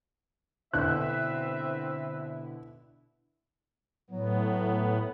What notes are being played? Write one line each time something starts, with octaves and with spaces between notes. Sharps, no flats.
B2 D3 C4 E4 B4 E5 F#6
A2 F#3 B3